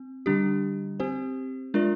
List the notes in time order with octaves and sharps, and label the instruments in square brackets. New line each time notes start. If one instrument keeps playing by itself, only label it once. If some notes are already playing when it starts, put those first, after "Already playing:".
Already playing: [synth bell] C4
D3 G3 D4 G4
C4 G4 C5
G#3 D4 F4 A#4 D5